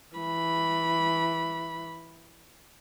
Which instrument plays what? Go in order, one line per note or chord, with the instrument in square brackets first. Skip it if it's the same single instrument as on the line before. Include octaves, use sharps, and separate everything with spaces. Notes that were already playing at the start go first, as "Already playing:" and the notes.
[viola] E3 B5